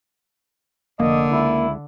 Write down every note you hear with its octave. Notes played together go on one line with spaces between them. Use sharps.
F1 D3 A#3 D#5
C#2 E4